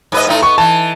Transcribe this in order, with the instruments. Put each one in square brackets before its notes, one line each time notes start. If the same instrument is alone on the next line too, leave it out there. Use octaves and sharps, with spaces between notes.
[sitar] G#2 B4 D#5
A2 A3 D#4
[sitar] B3 [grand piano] C#6
[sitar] E3 [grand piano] A5